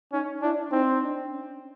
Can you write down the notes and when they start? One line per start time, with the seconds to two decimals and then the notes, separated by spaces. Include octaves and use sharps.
0.12 C#4 D#4
0.42 D4 E4
0.72 C4 D#4
1.02 D4
1.31 C#4